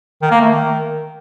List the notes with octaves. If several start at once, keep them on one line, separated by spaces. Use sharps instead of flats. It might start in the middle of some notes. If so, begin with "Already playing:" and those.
D#3
A#3
A3
D#3